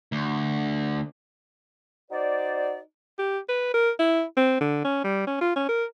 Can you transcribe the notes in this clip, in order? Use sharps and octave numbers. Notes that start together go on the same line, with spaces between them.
D2
D#4 F#4 C5 D5
G4
B4
A#4
E4
C4
D3
C#4
G3
C#4
F4
C#4
A#4